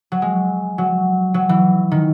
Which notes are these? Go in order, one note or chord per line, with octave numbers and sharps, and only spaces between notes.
F#3
G#3
F#3
F#3
E3
D#3